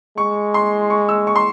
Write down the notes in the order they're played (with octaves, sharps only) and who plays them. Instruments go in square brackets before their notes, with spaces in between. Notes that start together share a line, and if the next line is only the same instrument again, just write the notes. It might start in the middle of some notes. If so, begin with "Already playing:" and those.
[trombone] G#3 [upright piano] C#6
[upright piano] C6
C#6
E6
C#6
C6